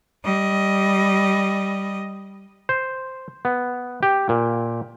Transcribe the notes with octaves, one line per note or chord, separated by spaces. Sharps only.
G3 D#5
C5
B3
G4
A#2